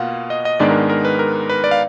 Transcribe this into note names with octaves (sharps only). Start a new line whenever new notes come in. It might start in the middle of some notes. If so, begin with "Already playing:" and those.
Already playing: B2 A#3 F4 F5 F#5
D#5
D#5
G#2 D#3 G#3 B3 D4 D5
A#4
A#4
B4
A#4
B4
D5
F5